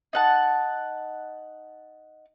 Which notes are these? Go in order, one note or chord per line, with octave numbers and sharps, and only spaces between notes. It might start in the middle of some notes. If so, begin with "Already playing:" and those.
D#4 F#5 A5